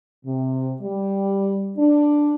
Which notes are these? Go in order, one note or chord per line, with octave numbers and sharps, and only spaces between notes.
C3
G3
D4